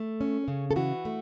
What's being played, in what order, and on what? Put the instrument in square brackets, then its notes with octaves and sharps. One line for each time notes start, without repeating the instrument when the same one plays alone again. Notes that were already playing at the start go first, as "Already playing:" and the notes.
Already playing: [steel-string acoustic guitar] A3
C#4
C#3
A4
E3 F#4
A3